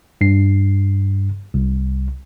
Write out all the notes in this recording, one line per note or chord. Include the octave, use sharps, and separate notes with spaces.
G2 C7
C2